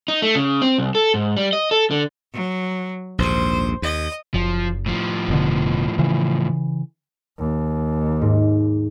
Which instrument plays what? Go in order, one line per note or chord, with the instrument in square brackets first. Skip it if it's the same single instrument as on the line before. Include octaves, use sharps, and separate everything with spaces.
[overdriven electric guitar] D#4
A3
C#3
C4
C2
A4
G#2
G3
D#5
A4
D3
[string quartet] F#3
[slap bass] A#1 D#2 G#2 [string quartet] C5
[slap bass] D#2 [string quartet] D#5
[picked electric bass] F#1 [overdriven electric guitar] F3
[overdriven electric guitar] A2 F3
[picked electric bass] F1 B2 D3
C#3 E3
[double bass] D#2
[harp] G#2